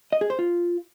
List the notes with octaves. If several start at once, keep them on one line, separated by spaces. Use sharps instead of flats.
D#5
G#4
C5
F4